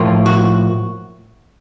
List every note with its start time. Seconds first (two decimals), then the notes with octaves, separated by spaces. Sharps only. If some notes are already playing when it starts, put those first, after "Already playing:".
Already playing: A2 F3 A#3 F4
0.26 F#4